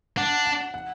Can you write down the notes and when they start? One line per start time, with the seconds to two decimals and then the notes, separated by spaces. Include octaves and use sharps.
0.17 D4 F#5
0.46 F#5
0.74 F#5